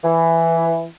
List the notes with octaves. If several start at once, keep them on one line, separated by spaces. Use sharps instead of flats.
E3